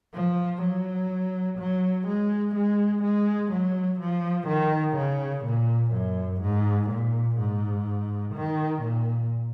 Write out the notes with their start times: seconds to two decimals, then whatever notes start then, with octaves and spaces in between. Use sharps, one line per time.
0.14 F3
0.62 F#3
1.59 F#3
2.07 G#3
2.55 G#3
3.03 G#3
3.52 F#3
4.00 F3
4.48 D#3
4.97 C#3
5.45 A#2
5.92 F#2
6.41 G#2
6.90 A#2
7.38 G#2
8.34 D#3
8.82 A#2